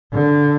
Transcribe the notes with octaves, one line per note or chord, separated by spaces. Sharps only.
D3